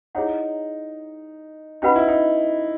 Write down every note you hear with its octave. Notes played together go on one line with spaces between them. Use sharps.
D#4 E4 G#4 C#5 F#5
C#4 D#4 F#4 B4 F#5 B5
E4
D#4